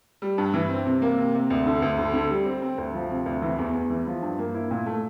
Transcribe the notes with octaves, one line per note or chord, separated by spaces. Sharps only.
G3
G2
E3
C4
C3
A#3
C3
C3
D2
D3
D2
D3
D3
G3
C4
C4
D2
F3
C3
D2
E3
E2
E2
E3
F3
G2
A#3
E4
A#2
A3